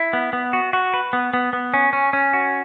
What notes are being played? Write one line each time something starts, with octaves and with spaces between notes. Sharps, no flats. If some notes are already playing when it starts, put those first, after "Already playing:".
Already playing: E4
B3
B3
F#4
F#4
B4
B3
B3
B3
C#4
C#4
C#4
F#4